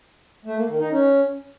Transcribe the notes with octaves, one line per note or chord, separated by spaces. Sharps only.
A3
A#3
D#3
D#4
C#4